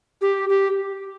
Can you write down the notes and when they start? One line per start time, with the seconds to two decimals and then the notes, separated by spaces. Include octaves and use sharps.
0.21 G4
0.49 G4